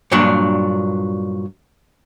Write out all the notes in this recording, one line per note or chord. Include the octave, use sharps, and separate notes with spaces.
G2 A#2 F#3 D4